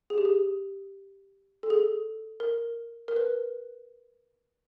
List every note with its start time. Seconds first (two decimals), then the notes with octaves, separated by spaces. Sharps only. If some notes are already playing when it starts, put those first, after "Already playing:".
0.10 G#4
0.18 G4
0.25 G#4
1.63 A4
1.70 G#4
1.78 A4
2.40 A#4
3.08 A#4
3.16 B4